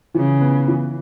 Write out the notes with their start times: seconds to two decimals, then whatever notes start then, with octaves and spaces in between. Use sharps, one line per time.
0.15 C#3 E3
0.41 B3
0.68 E3